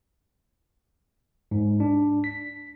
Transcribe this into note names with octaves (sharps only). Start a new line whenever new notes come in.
G#2
D4
B6